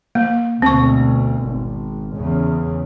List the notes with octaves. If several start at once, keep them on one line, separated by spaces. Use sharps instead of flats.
A#3
D2 B2 C4 C#6
G#1
E2 C#3